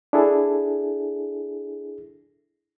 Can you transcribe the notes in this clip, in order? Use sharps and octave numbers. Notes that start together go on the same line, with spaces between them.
D4 E4 G#4 A4